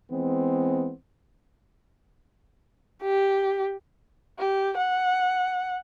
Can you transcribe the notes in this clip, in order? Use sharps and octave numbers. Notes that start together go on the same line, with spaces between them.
E3 G#3 B3 C4
G4
G4
F#5